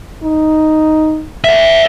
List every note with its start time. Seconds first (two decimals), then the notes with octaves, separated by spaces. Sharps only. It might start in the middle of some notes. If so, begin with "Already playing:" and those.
0.23 D#4
1.44 D5 E5